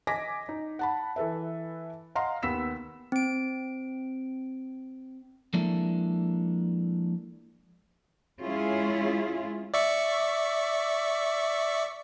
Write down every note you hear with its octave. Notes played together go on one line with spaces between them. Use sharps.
D#5 G#5 D6 A#6 B6
D#4
F#5 A5 B5
E3 A4 B4 E5
D#5 F5 F#5 A#5 C6
D#2 B3 E6 B6 E7
C4 D7
F3 G#3 A#3 D4 E4 A4
G#3 C#4 E4 F4 G#4
D5 E5 C#6